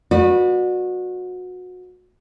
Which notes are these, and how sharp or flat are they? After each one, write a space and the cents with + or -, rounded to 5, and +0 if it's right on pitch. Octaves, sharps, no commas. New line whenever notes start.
F#4 -25 B4 -10 D5 +35